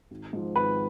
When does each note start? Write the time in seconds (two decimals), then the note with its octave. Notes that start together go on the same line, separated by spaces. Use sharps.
0.11 G#1
0.33 G#2 F3
0.56 G#1 B4